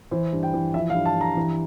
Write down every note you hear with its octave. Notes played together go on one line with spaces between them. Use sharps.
E3 C5
G2
G5
E3
F3 E5
F5
G2
A5
G2
A#5
E3